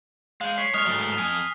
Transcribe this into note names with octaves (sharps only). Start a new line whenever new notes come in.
G#3 F5 G5
C#5 B6 C7
G#3 C#5 D#6 F6 F7
G#2 F#3 A3
F2 G#5